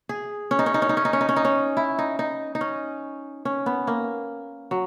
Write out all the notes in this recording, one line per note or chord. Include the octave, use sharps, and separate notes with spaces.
G#4
C#4
D#4
C#4
D#4
C#4
D#4
C#4
D#4
C#4
D#4
C#4
D#4
C#4
E4
D#4
D#4
D#4
C#4
C#4
B3
A#3
F#3